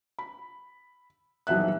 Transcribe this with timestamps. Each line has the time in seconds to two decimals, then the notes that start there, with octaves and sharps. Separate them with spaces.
0.19 B5
1.47 D#1 B1 E3 B3 E5 F#6